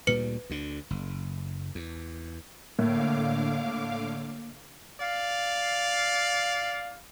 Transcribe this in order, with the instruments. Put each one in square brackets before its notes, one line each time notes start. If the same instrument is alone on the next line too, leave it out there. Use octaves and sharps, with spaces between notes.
[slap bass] D2 A#2 G3 [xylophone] B4 C#7
[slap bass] D2 D3
F#1
E2
[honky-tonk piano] A2 [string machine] D3 F5 D6 [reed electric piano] A#3
[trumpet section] D5 F5